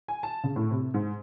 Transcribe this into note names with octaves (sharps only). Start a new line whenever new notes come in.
G#5
A5
C#3
A2
C3
G#2